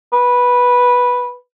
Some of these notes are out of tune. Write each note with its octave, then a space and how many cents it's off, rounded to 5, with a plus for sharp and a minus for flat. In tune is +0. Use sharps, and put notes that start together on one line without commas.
B4 -10